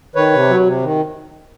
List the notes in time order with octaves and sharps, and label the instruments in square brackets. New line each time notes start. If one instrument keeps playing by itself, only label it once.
[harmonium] D#3 B4 C#5
C3
F#3
C3
D#3